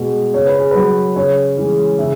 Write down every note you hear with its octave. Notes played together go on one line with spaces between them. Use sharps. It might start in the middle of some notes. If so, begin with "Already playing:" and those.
Already playing: B2 G#3
C#3 C#5
B4
G#4
F#3 B4
C#3 C#5
E3 G#3
C#3 E5